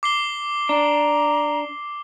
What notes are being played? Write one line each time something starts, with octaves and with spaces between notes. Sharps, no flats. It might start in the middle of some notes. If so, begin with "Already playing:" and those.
D6 C7 G7
D4 A#5